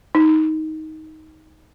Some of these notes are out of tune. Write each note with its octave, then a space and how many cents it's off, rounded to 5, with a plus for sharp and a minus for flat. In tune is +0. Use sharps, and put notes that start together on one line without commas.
D#4 +15